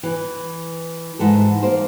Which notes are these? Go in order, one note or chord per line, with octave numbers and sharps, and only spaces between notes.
E3
G#2 E3 A4
A#3 C5